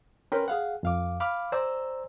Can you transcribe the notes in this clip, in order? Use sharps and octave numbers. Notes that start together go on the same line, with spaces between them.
C#4 A#4 B4 G5 B5 C6
G#4 F5 F#5
F2 F5 D6
F5 B5 D6 F6
C5 D5 G#5 A#5 C6 E6